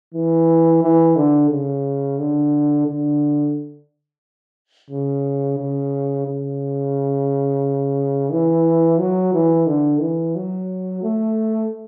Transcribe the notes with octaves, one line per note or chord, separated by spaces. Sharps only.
E3
E3
D3
C#3
D3
D3
C#3
C#3
C#3
E3
F#3
E3
D3
E3
F#3
A3